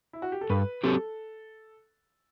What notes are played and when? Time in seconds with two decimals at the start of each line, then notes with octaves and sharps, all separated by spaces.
0.13 E4
0.22 F#4
0.32 G4
0.41 A4
0.50 G2 B4
0.83 F#3 C4 G4 A4